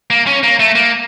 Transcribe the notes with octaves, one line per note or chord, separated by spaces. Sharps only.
A#3
C#4
A#3
A3
A#3